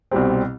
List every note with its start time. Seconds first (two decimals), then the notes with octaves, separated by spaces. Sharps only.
0.11 C2 B2 G3 C4